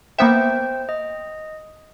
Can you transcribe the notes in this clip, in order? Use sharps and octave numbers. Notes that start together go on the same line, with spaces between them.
A#3 B3 C5 E5 G5
D#5